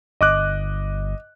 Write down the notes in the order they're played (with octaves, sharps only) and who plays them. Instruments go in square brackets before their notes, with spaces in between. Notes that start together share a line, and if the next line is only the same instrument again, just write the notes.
[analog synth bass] G1 [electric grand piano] D#5 D6 F#6